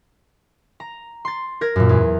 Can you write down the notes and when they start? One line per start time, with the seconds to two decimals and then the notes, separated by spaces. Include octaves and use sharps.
0.80 A#5
1.25 C6 A6
1.61 A#4 G#6 A#6
1.76 F#2 A#2
1.89 E2